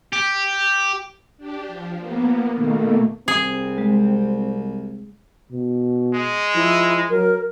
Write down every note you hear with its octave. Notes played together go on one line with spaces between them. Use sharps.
G4
D4 G4
F3
A#3 B3
B2 D#3 A3 A#3
C2 C4 G#4
G#3
B2
G#3
F3 E4
F#3 A#4